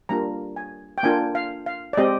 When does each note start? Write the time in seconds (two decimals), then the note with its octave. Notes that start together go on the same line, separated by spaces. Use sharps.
0.09 G3 A#3 D4 F4 A#5
0.56 G#5
0.98 G5
1.03 A#3 D4 F4 G#5
1.35 F5
1.66 F5
1.93 D5
1.97 G#3 C4 G4 D#5